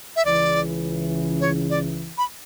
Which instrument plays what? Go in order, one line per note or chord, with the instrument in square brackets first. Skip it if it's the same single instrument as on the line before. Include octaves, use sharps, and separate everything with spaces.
[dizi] E5
[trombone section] C#2 C#3 E3 [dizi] D5
[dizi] C#5
D5
B5